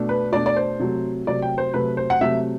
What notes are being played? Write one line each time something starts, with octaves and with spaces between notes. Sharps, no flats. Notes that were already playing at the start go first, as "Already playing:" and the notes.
Already playing: B2 A3 D4
B4
B2 A3 D4 D5
D5
C5
C3 F#3 A3
C3 F#3 A3 D5
G5
C5
C3 F#3 A3 B4
C5
F#5
C3 F#3 A3 E5